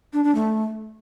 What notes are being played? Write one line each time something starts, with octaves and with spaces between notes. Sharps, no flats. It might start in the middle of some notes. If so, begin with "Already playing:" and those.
D4
D4
A3